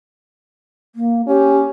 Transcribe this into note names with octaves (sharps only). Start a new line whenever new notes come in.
A#3
C#4 G4